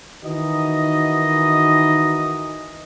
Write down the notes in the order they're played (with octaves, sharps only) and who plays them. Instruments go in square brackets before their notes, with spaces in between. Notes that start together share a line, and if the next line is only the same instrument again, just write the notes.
[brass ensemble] D#3 E3 D#4 F#4 D#5